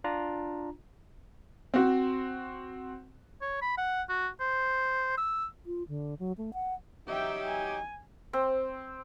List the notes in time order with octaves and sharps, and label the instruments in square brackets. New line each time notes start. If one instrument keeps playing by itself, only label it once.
[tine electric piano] D4 F4 A#5
[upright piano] C4 F#4
[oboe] C#5
B5
F#5
F#4
C5
E6
[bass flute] F4
D3
F#3
A3
F#5
[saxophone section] F#3 D#4 G4 [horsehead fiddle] E5 G5
[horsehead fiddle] G#5
[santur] C4